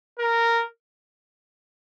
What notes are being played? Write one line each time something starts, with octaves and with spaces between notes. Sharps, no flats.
A#4